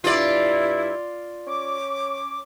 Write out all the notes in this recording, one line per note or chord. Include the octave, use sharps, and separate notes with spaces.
G2 E4 F4 D5
C#4 C#5 D6